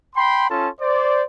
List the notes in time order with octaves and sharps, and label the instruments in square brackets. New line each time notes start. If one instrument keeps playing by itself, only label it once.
[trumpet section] G5 B5 C6
C#4 F4 A4 A5 C6
C5 D5